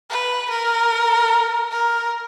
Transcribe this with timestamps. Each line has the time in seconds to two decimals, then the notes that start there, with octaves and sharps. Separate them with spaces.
0.10 B4
0.50 A#4
1.72 A#4